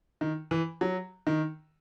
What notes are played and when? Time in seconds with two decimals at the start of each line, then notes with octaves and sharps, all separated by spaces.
0.21 D#3
0.51 E3
0.81 F#3
1.27 D#3